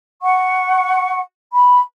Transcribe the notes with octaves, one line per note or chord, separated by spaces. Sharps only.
F#5 C#6
B5